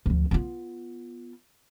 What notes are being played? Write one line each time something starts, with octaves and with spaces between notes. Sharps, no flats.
D2 F3
B3 F4